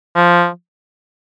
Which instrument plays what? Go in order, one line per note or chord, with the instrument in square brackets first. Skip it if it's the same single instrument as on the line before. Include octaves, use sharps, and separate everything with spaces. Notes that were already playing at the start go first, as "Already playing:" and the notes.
[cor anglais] F3